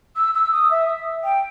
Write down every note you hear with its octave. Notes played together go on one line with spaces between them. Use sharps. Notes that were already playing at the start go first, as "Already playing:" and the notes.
E6
E6
D#6
E5
G5